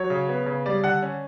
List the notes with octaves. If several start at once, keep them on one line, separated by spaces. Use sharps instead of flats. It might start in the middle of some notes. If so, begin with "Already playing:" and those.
Already playing: F#3 C#5
C#3
B3
C#3
G3 D5
D3 F#5
C#4